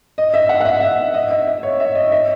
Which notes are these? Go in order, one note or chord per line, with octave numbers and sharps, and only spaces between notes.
D#5
E5
F#5
F#5
E5
E5
D#5
E5
E5
C#5
E5
D#5
E5